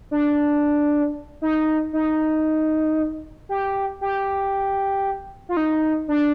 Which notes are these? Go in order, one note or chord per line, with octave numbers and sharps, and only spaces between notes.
D4
D#4
D#4
G4
G4
F4
D#4
D4